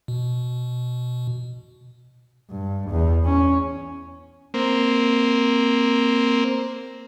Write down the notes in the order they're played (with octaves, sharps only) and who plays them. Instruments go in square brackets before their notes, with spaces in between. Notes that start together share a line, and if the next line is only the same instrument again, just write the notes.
[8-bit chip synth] B2
[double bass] G2
E2
C#4
[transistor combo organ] A#3 C4